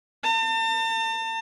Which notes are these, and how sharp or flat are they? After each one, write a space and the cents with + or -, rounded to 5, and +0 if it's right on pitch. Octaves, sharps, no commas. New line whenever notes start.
A5 +40